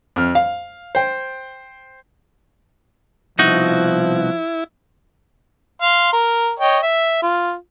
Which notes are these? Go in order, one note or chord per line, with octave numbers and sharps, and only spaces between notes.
F2 F6
F5
C5 G5
C2 B2 F3 D#4 E4 F#4
F5 C6
A#4
C#5 D#5 G5
E5
F4